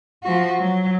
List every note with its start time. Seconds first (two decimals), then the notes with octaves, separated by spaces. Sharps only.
0.23 F3 F#4
0.59 F#3